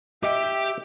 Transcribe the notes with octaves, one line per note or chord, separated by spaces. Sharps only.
G4 D#5 E5 G5 D6